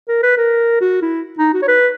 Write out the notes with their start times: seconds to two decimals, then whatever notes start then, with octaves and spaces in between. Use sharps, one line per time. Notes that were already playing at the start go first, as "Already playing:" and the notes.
0.08 A#4
0.23 B4
0.37 A#4
0.81 F#4
1.02 E4
1.38 D#4
1.54 F#4
1.62 C#5
1.68 B4